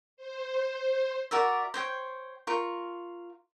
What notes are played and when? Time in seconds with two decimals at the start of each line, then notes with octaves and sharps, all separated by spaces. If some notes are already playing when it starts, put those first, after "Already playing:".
0.17 C5
1.31 F#4 A#4 D5 E5
1.74 C5 C#5 G5
2.47 F4 A#4 C#6